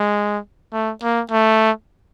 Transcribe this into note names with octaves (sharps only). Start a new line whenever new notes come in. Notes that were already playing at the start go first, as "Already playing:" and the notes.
Already playing: G#3
A3
A#3
A3